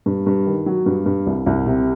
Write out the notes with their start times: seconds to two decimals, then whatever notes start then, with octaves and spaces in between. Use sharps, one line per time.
0.06 G2
0.26 G2
0.46 D#3
0.66 F#3
0.86 G2
1.06 G2
1.27 C2
1.46 C2
1.66 C3